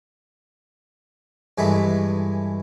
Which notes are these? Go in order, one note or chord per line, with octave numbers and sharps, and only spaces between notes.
G2 E3 G#3 A3 E4 B5